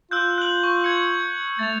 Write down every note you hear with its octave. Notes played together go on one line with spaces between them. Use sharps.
F4 E6 F#6 G6
F#6 F#7
C#6
G#6 C#7
A3 A6 F7